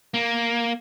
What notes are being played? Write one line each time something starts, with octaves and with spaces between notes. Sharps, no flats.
A#3